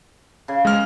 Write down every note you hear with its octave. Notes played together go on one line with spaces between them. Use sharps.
C#3
G#3 F6